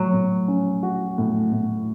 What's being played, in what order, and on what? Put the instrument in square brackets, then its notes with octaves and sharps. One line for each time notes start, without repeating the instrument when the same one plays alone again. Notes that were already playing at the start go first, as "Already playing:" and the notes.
Already playing: [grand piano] A2 [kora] F#3
[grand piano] A2
C#4
F#4
A2
A2